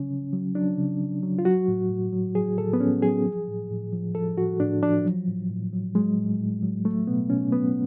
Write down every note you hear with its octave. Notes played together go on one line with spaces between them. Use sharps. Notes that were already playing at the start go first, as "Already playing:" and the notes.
Already playing: C#3 F#3 C#4
C#3
F#3
F#3 D4
C#3
C#3
F#3
F4
F#3 F#4
A2
A2
F#3
F#3 G#4
A2 A4
B3
A2 C#4
F#3 G#4
F3
A2
A2
F3
F3 A4
A2 F#4
A2 D4
F3 D4
F#3
A2
A2
F#3
F#3 G#3
A2
A2
F#3
F#3 A3
B2 B3
B2 C#4
F#3 B3